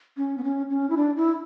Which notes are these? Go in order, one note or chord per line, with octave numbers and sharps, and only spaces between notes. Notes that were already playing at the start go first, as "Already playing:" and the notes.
C#4
B3
C#4
C#4
E4
D4
E4